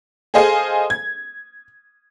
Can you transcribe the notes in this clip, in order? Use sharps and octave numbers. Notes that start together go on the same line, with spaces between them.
G#4 A4 C5 D#5 F5 G#5
G#6